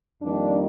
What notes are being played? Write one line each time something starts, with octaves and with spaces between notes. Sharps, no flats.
F2 D#3 G3 A#3 D4